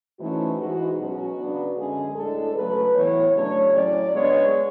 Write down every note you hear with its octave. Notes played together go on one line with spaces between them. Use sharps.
G#2 E3 A3 C#4 F#4
G#2 E3 G#3 F#4
B2 F#3 C#4 F#4
C#3 F#3 B3 D4
F#2 D3 G#3 C#4 G#4
A2 G#3 D4 A4
C#3 F#3 A3 B4
A2 E3 B3 C#5
C#3 F#3 A3 D4 C#5
A2 F#3 C#4 D5
C#3 G#3 B3 D4 C#5